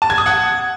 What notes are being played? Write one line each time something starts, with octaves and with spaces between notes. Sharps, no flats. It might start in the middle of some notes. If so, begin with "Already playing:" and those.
A5
G#6
D#6
F#5